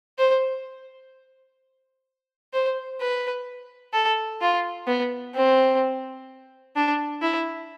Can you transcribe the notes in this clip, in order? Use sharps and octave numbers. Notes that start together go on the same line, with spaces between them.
C5
C5
B4
A4
F4
B3
C4
D4
E4